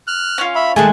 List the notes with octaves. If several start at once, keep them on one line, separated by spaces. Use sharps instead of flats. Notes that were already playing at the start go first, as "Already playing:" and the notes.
F6 F#6
C#4 F4
E5 B5
D#3 G#3 A3 G#5 A5 F#6